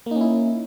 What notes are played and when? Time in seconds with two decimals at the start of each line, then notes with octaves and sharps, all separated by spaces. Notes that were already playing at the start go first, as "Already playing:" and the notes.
0.06 A#3
0.11 D#4
0.16 C#4
0.21 E4